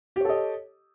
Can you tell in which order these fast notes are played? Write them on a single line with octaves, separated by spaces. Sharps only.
G4 C#5 A4 D#5